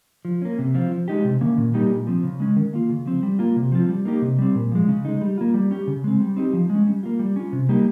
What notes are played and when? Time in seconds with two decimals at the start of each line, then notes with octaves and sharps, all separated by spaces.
0.25 F3
0.42 A#3 C#4
0.59 C3
0.74 F3 C4 F4
0.91 F3
1.08 G#3 D#4 G4
1.24 C3
1.41 D#3 A#3 C#4
1.57 A#2
1.74 G3 A#3 D#4 G4
1.90 A#2
2.07 F3 C4
2.24 C#3
2.40 G#3 C#4
2.56 D#3
2.73 A#3 F4
2.89 C#3
3.06 F3 C4
3.23 G3
3.39 A#3 F4
3.56 C3
3.72 F3 C4 F4
3.89 G3
4.05 A#3 D#4 G4
4.22 C3
4.38 G3 C4
4.55 A#2
4.72 F3 G#3
4.88 C#3
5.05 G#3 D#4
5.22 G3
5.38 A#3 F4
5.54 G3
5.71 C#4 G4
5.87 C#3
6.04 G#3 C4
6.20 G3
6.37 C4 D#4 G4
6.53 F3
6.70 G#3
6.75 C#4
6.86 G3
7.03 A#3 F4
7.19 G3
7.36 C#4 F4
7.53 C3
7.69 G3 A#3 D#4 G4